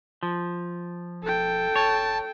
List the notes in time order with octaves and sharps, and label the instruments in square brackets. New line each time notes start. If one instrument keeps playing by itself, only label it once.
[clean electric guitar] F3
[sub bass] E1 [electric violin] A4 G5
[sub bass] E1 [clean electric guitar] C#5 [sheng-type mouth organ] A5